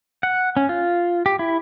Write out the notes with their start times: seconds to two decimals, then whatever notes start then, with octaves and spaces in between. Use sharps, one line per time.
0.23 F#5
0.57 C#4
0.69 F4
1.26 G4
1.39 E4